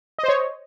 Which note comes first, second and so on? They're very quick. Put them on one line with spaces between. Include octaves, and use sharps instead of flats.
D#5 C5 C#5